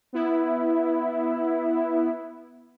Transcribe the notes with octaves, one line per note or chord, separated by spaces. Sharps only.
B3 E4